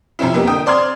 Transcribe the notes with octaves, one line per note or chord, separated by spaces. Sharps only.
C3 F3 C4 C#4 E4
F2 A#3 B3 G4
D3 G5 D#6
C4 D5 C6 F6 G#6